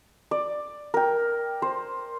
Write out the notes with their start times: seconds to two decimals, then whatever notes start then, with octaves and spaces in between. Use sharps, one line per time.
0.31 D5
0.94 A#4 G5
1.62 C5